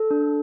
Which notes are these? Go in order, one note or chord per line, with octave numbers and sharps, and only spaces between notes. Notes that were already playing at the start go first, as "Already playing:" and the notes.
Already playing: A4
D4